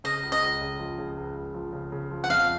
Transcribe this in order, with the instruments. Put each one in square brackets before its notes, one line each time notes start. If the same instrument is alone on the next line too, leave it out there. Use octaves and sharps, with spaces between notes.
[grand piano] C#3 [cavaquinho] D#5
[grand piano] C#2
[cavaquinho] D#5
[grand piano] C#2
C#3
F3
C#3
C#2
C#2
F3
C#3
C#3
F3
[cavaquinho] F#5
[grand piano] F2 [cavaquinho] F5